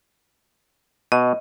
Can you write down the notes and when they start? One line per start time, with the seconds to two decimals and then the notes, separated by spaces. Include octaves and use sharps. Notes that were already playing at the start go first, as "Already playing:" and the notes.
1.12 B2 D#5